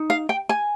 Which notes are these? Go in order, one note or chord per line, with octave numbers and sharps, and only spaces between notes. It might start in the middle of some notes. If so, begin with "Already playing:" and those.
Already playing: D#4
F5
G5
G#5